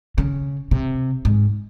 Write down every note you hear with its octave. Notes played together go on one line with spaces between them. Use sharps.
C#3
C3
G#2